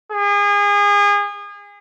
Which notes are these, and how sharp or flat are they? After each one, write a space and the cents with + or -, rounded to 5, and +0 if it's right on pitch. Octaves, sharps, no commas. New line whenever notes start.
G#4 -30